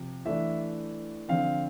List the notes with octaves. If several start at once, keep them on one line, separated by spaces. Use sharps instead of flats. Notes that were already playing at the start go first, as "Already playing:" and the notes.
Already playing: C3 F3
E3 A3 D4 E5
D3 F3 C4 F5